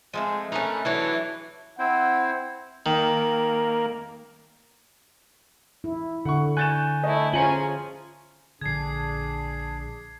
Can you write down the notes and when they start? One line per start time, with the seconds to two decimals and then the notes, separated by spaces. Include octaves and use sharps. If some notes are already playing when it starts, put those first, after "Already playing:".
0.13 F3 G#3 A3 C4
0.52 A3 C#4 D#4 A#4 B4
0.85 E3 F#3 A3 D4 C#5
1.79 C4 E4 C5 F#5
2.86 D#3 A#3
5.84 E4
6.25 D3 F#5 C#6
6.57 G#5 C#6 F#6 G6 A6 E7
7.04 A3 E4 D#5
7.33 C#4 F4 G#4 C5 G#5 A#5 C#7 F#7
8.61 A#1 D3 D4 G#4 G#6 C7